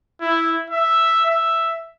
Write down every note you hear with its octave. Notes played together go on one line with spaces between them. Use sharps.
E4
E5
E5